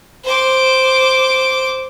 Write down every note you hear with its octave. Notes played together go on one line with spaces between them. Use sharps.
C5 D6